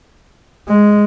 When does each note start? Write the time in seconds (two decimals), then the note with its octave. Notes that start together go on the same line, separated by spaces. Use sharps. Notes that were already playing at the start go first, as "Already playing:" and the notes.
0.69 G#3